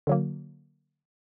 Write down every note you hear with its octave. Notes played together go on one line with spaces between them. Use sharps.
D3 F#3 A#3